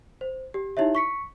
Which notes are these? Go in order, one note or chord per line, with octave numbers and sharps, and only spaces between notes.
C5
G4
D#4 E4 G4 C#5 E5
C#6 B6 C#7